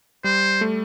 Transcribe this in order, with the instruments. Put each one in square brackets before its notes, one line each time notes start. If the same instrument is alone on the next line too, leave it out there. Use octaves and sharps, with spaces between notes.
[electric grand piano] G3 [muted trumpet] C5
[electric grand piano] A3